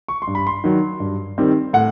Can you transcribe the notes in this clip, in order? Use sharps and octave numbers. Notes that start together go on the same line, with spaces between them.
C#6
C6
G2
B5
C6
D#3 F#3
G2
D#3 G3 C4
A2 F#5